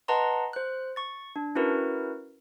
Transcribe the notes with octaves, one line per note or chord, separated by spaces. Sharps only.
B4 D#5 F#5 A5 A#5 C6
C5 F#6
C#6 A6
D4
C#4 E4 F#4 A#4 B4